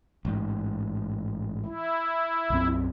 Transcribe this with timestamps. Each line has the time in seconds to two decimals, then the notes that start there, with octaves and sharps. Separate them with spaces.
0.25 A1 G#2
1.66 E4
2.50 B1 F#2 C4